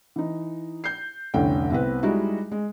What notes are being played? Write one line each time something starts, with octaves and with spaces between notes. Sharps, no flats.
E3 D#4
G6 C7
F1 C2 D3 C#4 G5
C2 B3 C4 B4
G3 G#3 D#4 E4 F#4
G#3